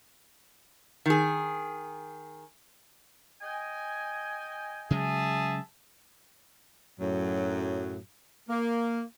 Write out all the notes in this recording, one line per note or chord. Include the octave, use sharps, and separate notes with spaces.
D#3 G#4
D#5 G5 G#5
C#3 F#3 G#3 G#4 E5 A5
F#2 A2 F#3
A#3